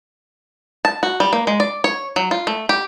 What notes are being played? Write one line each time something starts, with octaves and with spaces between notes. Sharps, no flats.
A5
F#4
G3
A#3
G#3
D5
C#5
F#3
F4
A3
G4